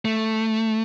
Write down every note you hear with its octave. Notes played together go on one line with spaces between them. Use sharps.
A3